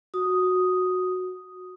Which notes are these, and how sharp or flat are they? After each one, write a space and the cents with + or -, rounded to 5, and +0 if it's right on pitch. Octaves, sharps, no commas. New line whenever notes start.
F#4 -10 D#6 +0